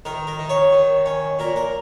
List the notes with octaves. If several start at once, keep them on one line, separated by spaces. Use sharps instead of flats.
D#3 A#4
A#4
D#3
C#5
D#3
C#4
A#2 A#4
A#4